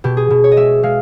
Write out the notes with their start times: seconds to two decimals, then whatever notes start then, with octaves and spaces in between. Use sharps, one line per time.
0.04 B2 G4
0.17 G#4
0.30 B2
0.44 C#5
0.52 D#5
0.57 G#3 E5
0.83 G#3 F5